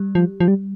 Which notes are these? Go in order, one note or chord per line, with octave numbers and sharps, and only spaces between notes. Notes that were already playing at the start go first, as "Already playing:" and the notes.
Already playing: G3
F3
F3
G3